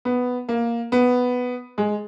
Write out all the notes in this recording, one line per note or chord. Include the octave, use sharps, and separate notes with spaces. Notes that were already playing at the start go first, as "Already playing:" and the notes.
B3
A#3
B3
G#3